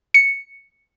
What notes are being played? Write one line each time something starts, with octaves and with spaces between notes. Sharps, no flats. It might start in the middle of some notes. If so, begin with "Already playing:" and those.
C#7